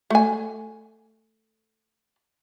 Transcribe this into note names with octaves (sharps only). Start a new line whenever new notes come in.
A3 G#5